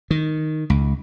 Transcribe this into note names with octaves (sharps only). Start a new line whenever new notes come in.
D#3
C#2